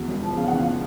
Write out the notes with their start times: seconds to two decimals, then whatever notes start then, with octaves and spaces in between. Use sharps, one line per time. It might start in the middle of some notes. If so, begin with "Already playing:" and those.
Already playing: E2 F#4
0.08 E1
0.22 F3
0.36 C#3 F5
0.48 E2 F#5
0.58 F4 F5